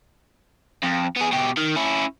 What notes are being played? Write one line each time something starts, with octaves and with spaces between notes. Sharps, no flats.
F2
B3 G#4
B2 G4
D#3
C#4 E4